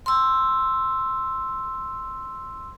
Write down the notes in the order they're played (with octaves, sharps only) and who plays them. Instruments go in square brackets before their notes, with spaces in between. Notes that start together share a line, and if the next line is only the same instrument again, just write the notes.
[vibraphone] C6 E6